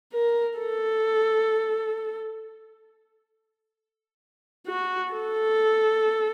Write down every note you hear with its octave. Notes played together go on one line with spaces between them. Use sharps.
A#4
A4
F#4
A4